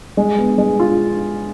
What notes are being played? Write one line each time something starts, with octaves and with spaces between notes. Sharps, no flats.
G#3
B3
G#3
F4